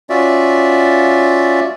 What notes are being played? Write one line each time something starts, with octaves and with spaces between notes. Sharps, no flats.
C#4 F4 F#4 D5 E5